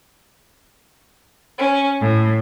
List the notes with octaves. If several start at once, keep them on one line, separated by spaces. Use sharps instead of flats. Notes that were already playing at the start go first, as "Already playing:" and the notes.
C#4
A2